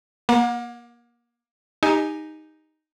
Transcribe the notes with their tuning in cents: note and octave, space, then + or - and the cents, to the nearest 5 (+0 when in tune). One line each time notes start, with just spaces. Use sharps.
A#3 +25 F#5 -40
D#4 +0 G4 +20 G#5 +5